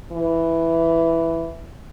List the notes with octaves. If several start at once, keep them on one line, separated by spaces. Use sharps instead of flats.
E3